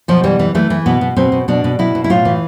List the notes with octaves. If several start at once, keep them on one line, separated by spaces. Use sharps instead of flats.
B2 F3
E3 G3
E3
E3 A3
E3
B2 B3
B2
B2 C4
B2
B2 D4
B2
B2 E4
B2
E4
A2 F4
E3